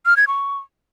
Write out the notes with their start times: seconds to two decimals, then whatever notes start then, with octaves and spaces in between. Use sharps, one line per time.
0.06 F6
0.17 G#6
0.28 C#6